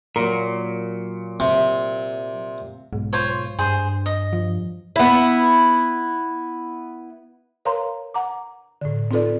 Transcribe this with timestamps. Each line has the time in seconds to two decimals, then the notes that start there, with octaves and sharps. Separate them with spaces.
0.16 A#2 F#3 A#4
1.40 C3
2.93 B1 G#2
3.13 F4 C5 C#5
3.59 G2 G#4 C5 C6
4.06 D#5
4.33 F3
4.96 B3 E4
7.65 A#4 B4 C#5 F5 A#5 C6
8.14 F#5 A#5 D6
8.81 A2 D3
9.11 C4 D#4 F4 A4 B4 D5